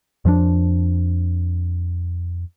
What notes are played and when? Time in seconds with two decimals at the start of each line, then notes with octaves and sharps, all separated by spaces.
0.25 F2 F3 A3 D4